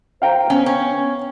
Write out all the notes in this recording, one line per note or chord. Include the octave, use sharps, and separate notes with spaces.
C5 F5 G5 A#5
B3 C#4
C#4